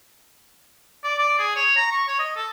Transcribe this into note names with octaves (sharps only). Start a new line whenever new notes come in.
D5
D5
G#4
C#5
A#5
C#6
C#5
D#5
A4